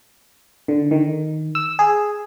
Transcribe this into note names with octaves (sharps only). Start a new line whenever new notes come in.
D3
D#3
E6
G#4